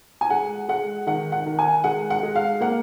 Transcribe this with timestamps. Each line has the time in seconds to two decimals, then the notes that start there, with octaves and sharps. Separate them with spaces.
0.21 G#5
0.30 G#3 F#5
0.69 G#3 F#5
1.07 D#3 F#5
1.32 F#5
1.46 D#3
1.59 G#5
1.84 G#3 F#5
2.10 F#5
2.23 G#3
2.35 F5
2.60 A#3 F#5